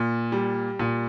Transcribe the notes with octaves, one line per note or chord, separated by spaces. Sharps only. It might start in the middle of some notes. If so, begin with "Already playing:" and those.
Already playing: A#2
G3
A#2